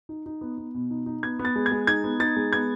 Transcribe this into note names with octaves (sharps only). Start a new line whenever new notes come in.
D#4
D#4
B3
B3
B2
D#4
D#4
B3 G#6
B3
A6
G#3
G#6
G#3
D#4 G#6
B3
D#4 A6
G#3
B3 G#6